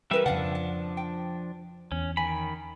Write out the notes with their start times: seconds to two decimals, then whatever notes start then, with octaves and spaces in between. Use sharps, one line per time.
0.11 E3 G3 A#4 B4 E5 G5
0.26 F2 C#3 F3 D4 F5 F#5
0.55 F#5
0.97 G5
1.92 E2 C#4
2.17 D#3 G#5 B5